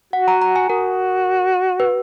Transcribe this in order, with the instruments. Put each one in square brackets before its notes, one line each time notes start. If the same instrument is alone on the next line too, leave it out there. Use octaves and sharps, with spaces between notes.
[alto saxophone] F#4 [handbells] F#5
[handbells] A#5
A#5
G#5
[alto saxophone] F#4 [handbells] A#4
[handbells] B4